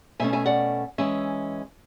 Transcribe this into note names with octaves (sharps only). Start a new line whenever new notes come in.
B2 A3 C#4 E5 G#5
E5 G#5
D5 F#5
E3 G#3 C#4 E5 G#5